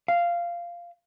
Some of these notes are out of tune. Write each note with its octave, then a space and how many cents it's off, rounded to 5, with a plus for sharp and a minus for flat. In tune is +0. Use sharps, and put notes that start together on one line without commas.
F5 -10